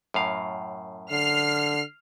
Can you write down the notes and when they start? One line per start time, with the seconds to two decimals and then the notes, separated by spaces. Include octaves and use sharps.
0.14 F#2 A2 F5
1.12 D3 F6 C7